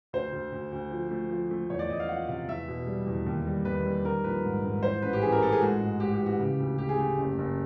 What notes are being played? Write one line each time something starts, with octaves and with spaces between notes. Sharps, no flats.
D2 C5
D2
D2
D2
F3
A3
F3
A3
E2 C#5
D5
E2 D#5
F5
F3 F#5
C3 F5
E2 E5
B2
G3
E2
D#2
G3
D#2 B4
G3
D#3 A#4
A#1 B4
G#2
G#2
E3 C5
A1 B4
G4
E3 G#4
A#4
A2 A4
G#4
G#3 F#4
G#2
G#2 G4
G4
E3
F#4
C#3 G4
D2
D2 G4
G#4
A3 G4
F#1
F#1